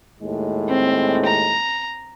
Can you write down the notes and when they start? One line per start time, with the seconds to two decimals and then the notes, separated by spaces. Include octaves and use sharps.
0.21 D#2 A2 G#3
0.69 C4
1.25 A#5